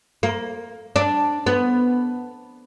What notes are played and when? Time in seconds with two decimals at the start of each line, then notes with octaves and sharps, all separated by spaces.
0.23 A#3
0.96 D4
1.46 B3